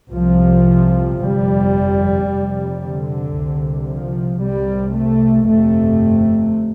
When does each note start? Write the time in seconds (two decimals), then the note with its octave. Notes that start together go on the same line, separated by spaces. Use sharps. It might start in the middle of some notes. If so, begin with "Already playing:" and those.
0.13 C2 C3 F3
1.19 G1 F2 C3 G3
2.27 F1 F2 C3
2.80 D3
3.34 C2 C3
3.87 F3
4.41 C2 C3 G3
4.94 A3
5.48 G1 F2 C3 A3